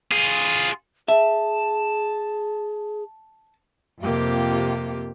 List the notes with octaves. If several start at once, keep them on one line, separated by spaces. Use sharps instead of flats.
F4 G#4
G#4 E5 A5
F2 C3 A#3 F4 G4